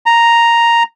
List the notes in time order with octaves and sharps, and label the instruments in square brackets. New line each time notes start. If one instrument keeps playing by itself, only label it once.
[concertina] A#5